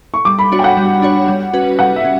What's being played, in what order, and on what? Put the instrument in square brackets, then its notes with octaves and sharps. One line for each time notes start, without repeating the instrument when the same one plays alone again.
[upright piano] C#6
[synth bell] G3 [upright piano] D6
[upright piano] B5
[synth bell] D4 F#4 C#5
[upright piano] G5
F#5
[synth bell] G3
D4 F#4 C#5
G3
C#4 F#4 B4
[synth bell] G3 [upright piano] F#5
[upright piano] E5
[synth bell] C#4